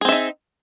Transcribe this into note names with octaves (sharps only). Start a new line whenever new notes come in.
C4 D#4 G#4 E5